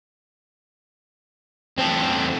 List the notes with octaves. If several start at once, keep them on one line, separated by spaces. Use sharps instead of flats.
E2 A3 C4 C5 A5